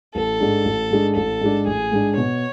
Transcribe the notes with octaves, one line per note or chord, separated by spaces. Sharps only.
A1 A4
G#2 G#3 D4
A1
G#2 G#3 D4
A1 A4
G#2 G#3 D4
A1 G#4
G#2 G#3 D4
B2 C#5